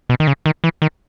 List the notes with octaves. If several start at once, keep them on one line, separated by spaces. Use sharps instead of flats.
B2
D#3
C#3
D#3
E3
D#3